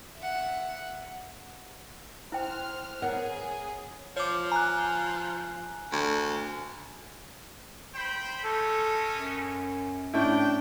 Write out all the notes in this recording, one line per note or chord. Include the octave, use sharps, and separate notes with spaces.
E5 F#5
E4 C5 G5 F6 F#6
B3 G#4 A#4 C#5 F#5
F3 C#5 D6
G#5 A#5 F#6
D2
C5 G5 B5
G#3 A3 C#4 A4
F#2
A2 C#4 D4 E4 G5